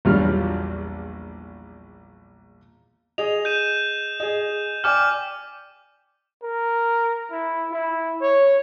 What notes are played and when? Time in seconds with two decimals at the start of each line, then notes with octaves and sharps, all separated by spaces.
0.05 A#1 E2 F#3 G3 F4 F6
3.18 G#4 D#5 F7
3.45 G6 D#7 E7
4.20 G#4 D#5
4.84 D5 G5 G#5 D6 F6
6.42 A#4
7.30 E4
7.71 E4
8.21 C#5